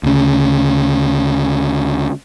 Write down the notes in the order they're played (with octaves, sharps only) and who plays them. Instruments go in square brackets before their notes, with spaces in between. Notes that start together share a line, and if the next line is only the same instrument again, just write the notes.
[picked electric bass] D2 C#3